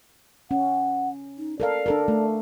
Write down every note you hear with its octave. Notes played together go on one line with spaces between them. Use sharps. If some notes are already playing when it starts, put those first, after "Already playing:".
C#4 F#5
D#4
A4 A#4 D5 F5
D4 A4 A#4
A3